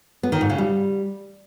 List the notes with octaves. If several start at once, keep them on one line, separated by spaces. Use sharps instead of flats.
B3
D#3
G#2
C#3
G3